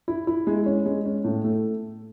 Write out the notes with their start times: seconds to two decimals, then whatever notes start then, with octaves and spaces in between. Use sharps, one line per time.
0.08 E4
0.27 E4
0.47 G#3
0.66 C#4
0.86 G#3
1.05 C#4
1.24 A2
1.44 A3